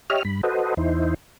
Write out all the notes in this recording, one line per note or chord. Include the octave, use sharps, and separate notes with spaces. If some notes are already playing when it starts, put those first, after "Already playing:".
G4 C#5 D#5 E5 F6
G2 B5
F#4 A4 B4 C5 D#5
E2 D#4 E4 C5